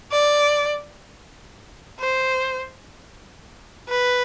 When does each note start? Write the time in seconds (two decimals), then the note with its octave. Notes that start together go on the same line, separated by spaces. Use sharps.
0.12 D5
2.00 C5
3.89 B4